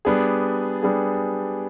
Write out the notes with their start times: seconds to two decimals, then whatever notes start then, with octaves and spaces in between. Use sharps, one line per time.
0.05 G3 B3 D4 G#4
0.83 G3 B3 D4 G#4